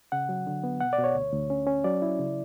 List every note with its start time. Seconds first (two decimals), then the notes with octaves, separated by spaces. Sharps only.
0.12 C#3 F#5
0.29 F#3
0.47 D3
0.64 B3
0.81 B2 F#5
0.93 D5
0.98 B2
1.04 C#5
1.15 D2
1.32 D2
1.50 C#4
1.67 C#4
1.84 F#3 D5
2.02 E4
2.19 C#3